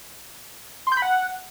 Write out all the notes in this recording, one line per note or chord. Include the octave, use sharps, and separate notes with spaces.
C6
G6
B5
F#5